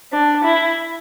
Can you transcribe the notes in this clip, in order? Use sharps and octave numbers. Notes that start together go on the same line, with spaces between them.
D4
E4